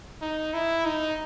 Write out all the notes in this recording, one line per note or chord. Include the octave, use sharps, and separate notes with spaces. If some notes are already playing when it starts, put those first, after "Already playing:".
D#4
E4
D#4